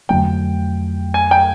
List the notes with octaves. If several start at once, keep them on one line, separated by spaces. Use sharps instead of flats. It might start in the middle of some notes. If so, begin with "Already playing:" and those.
F2 D3 F#3 A3 G5
G#5
G5